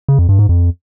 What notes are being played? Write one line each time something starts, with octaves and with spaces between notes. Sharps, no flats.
C#3
F2
G2
G#2
F2